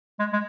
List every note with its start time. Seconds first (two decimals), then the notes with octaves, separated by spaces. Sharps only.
0.19 G#3
0.33 G#3